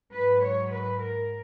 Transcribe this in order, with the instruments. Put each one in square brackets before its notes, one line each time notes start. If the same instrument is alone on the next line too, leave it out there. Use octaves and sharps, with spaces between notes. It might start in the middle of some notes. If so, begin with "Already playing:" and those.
[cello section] G#2 F#3 B4
C#5
B4
A#4